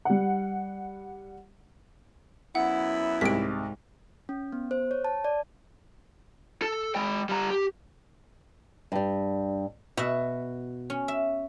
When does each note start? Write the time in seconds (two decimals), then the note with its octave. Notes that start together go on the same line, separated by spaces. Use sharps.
0.05 G3 F#5
2.55 F#2 B3 E4 F#5
3.21 C2 G#2 B6 D7
4.29 C#4
4.52 B3
4.71 C5
4.91 C#5
5.05 A5
5.25 D5
6.62 A4
6.95 G#3 G5
7.29 G3 A#5
7.51 G4
8.92 G2 G3
9.97 B2 F#4 E5
10.90 C#4
11.08 E5